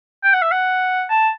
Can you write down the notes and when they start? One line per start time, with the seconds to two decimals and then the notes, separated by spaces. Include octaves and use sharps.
0.24 G5
0.34 F#5
0.42 E5
0.52 F#5
1.10 A5